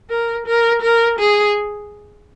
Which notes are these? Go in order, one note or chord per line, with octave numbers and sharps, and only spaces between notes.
A#4
A#4
A#4
G#4